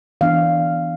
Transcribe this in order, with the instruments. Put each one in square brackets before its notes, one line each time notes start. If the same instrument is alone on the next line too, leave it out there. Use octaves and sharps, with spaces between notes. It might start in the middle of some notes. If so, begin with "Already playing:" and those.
[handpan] E3 B3 D4 F5